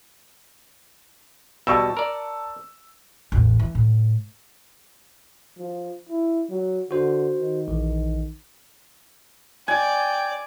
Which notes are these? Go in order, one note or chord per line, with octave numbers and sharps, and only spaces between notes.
B2 G3 A5 C#6 E6
A#4 D5
A1 E2
E3
A2
F3
E4
F#3
D3 F#4 C5
D#3
A#1 E3
D5 G5 G#5